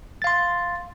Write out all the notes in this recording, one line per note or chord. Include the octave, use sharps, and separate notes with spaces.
F5 C6 A6